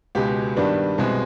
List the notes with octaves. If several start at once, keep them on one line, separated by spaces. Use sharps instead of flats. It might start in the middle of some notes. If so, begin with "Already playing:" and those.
C#2 B2 G#3 G4
G2 D#3 G3 B3 D4
C2 B2 G#3 C4